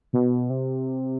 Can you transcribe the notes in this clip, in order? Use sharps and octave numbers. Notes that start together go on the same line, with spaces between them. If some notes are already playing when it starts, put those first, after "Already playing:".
B2
C3